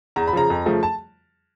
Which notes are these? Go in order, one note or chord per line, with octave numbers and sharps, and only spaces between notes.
E2 A#5
B5
C#3 F3 A#5
F2
C#3 F3 A3
A5